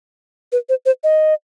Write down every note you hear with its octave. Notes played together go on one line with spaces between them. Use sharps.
B4
C5
C5
D#5